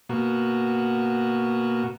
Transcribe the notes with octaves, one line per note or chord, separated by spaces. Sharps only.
B2 A#3 F#4